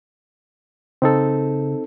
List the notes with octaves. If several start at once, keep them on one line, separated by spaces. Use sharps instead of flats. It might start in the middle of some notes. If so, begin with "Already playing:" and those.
C#3 C4 D#4 A4